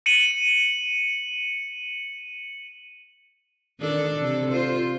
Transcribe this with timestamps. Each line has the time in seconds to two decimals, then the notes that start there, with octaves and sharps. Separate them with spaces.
0.06 C#7 D#7 F#7
3.80 D#3 D4 A4
4.20 C3 A4
4.51 F4 C5